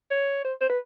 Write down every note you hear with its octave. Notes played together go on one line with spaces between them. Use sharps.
C#5
C5
C5
B4